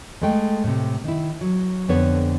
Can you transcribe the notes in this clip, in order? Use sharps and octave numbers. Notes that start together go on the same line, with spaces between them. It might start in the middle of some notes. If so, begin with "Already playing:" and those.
G#3 A3 G5
A2 C3
D#3 E4
F#3
F2 D3 B3 C#5